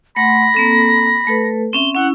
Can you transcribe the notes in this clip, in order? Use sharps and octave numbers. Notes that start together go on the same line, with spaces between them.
A3 F#5 B5 C6 A#6
A#3 C4 A4
A3 A4 B4
C4 C#4 E5 G7
C#4 E4 F#5